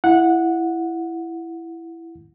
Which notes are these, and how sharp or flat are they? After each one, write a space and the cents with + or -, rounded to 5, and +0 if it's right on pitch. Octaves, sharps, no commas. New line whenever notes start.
E4 +10 F#5 -15